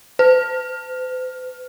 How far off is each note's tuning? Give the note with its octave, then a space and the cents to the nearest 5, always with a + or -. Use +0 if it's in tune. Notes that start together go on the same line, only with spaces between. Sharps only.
C5 -45